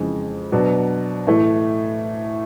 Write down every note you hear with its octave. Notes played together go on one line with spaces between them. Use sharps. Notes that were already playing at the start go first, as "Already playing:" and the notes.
Already playing: F2 C#3 E3 G#3
B2 F#3 B3 D4 F#4
A2 E3 A3